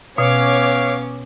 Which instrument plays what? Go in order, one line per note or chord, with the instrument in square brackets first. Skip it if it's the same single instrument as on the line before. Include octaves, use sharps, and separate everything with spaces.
[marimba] B2 [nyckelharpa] B3 C#4 [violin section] C#5 D6 [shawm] F5